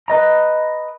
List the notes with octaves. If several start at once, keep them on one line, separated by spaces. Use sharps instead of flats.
B4 D#5 A#5